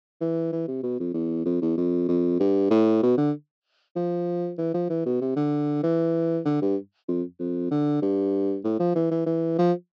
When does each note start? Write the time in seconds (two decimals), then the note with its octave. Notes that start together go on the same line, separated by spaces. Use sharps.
0.21 E3
0.52 E3
0.68 C3
0.83 B2
1.00 F2
1.14 E2
1.46 F2
1.62 E2
1.77 F2
2.08 F2
2.40 G2
2.70 A2
3.03 B2
3.17 D3
3.96 F3
4.58 E3
4.74 F3
4.90 E3
5.06 B2
5.21 C3
5.36 D3
5.83 E3
6.45 D3
6.62 G2
7.09 F2
7.39 F2
7.71 D3
8.02 G2
8.64 A2
8.80 F3
8.95 E3
9.11 E3
9.26 E3
9.58 F3